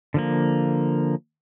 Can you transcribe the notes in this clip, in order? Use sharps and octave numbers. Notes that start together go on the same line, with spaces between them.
D3 F3 A#3